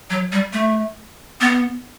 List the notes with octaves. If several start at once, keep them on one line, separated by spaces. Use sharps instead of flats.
F#3
G3
A3
B3